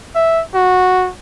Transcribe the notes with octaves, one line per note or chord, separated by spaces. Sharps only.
E5
F#4